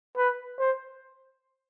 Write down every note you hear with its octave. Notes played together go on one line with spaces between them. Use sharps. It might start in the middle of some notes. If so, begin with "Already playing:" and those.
B4
C5